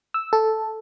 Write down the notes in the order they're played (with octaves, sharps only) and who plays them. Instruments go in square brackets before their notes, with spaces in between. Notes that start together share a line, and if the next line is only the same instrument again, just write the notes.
[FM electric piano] E6
A4